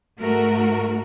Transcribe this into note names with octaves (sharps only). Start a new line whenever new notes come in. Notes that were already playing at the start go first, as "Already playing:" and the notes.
G#2 A3 F#4 A#4